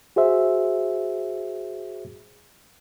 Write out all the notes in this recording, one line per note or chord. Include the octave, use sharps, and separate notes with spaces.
F#4 G#4 C5 E5